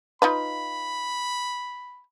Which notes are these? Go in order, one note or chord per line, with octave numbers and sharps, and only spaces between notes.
D#4 F4 B4 B5